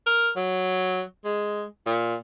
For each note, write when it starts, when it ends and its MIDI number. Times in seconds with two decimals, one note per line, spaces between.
0.06 0.30 70
0.36 1.02 54
1.24 1.64 56
1.86 2.15 46